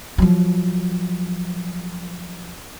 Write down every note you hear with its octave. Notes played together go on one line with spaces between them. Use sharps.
F3 F#3